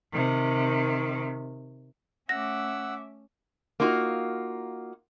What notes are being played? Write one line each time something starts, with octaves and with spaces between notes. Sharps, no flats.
C3 D#3
A3 C#4 E5 F#5 D6 E6 A#6
A#3 D#4 F4 F#4